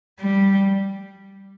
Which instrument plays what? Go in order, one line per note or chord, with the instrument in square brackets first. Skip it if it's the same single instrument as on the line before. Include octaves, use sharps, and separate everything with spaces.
[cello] G3